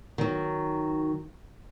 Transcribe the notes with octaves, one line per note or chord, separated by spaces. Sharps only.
D#3 F#3